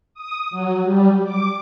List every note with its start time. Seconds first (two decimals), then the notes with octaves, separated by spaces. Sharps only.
0.14 D#6
0.51 F#3
0.83 G3
1.24 D6